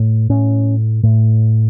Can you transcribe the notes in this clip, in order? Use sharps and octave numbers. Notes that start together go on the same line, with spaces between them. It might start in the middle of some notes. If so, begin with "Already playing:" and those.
Already playing: A2
A2 C#4
A2